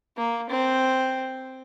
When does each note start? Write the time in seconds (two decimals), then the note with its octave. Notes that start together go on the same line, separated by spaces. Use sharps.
0.17 A#3
0.50 C4